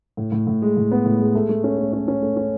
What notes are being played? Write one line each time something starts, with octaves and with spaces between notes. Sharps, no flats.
A2
A2
A2
G#3
A2
B3
A2
G#3
A3
A3
C#4
A3
C#4
C#4
A3
C#4